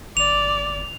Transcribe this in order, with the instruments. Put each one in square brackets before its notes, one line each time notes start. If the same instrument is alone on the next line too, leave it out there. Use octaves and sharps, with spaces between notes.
[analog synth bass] G1 [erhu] D5 [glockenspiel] F7